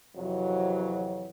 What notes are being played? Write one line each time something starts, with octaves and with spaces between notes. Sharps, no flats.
F2 C3 E3 F#3